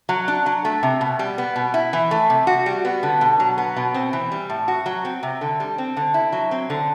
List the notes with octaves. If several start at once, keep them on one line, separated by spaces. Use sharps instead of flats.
F#3
D4
F#3
A3
C3
B2
G3
B3
B2
E4
E3
A3
C3
F#4
G3
B3
D3
B2
F#3
B3
B2
C4
E3
G3
A2
F#4
F#3
C4
C3
D3
G3
C4
D3
E4
F#3
C4
D3